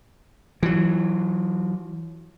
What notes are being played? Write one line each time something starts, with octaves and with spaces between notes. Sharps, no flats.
E3 F#3